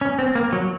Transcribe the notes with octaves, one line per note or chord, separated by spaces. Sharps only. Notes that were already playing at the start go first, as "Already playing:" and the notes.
C#4
C4
A#3
F#3